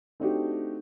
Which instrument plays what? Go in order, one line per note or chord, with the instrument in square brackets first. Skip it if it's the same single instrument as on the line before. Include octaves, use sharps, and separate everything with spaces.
[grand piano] A3 C4 D4 D#4 F#4 G4